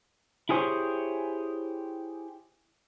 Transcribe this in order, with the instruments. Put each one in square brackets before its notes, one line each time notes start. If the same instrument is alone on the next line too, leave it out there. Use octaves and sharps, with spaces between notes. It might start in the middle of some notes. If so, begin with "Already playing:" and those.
[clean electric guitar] E4 G4 G#4 C5 C#5